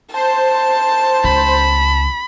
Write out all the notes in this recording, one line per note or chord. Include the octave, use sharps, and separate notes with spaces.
C5 A5
C#2 B5